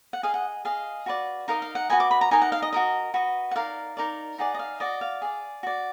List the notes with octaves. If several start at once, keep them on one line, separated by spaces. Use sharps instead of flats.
F#5
G#4 D#5 F5
F#5
G#4 D#5 F5
F#4 B4 D5
D#4 A#4 D#5 F5
F5
F#5
F#4 B4 D#5 G#5
D6
B5
A#5
D#4 A#4 D#5 G#5
F#5
F5
D#5
F#4 A#4 D#5
F#4 B4 D#5
F#5
D#4 A#4 D5 F5
D#4 A#4 D5
D#4 G#4 D5 F#5
D#5
F5
F#4 D5 D#5
F5
G#4 D5
F#4 D5